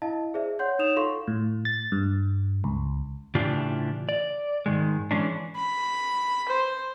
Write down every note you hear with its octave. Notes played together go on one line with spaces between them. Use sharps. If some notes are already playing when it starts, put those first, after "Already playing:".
E4 D#5 F5 A5
G#4 C5 D5 E5
C#5 F#5 C6 G6
D#4 C#5 D#6 E7 F7
F4 A4 F5 C6 C#6
A2
A6
G2
C#2
A2 C#3 E3 D4 F4 G4
D5
G#2 D#3 G#3
E3 G#3 C#4 D4
B5
C5